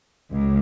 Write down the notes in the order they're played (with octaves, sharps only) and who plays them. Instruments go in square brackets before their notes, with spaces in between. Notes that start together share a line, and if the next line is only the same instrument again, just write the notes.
[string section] C#2